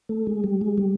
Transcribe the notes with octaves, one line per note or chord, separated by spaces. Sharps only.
A3
G#3
G3
G#3
G3